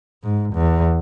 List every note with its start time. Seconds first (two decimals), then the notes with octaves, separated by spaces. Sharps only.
0.23 G#2
0.54 E2